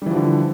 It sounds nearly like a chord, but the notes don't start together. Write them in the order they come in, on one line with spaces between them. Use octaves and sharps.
G3 E3 F3 D3